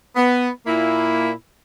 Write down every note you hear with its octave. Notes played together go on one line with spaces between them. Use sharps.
B3
A#2 A#3 E4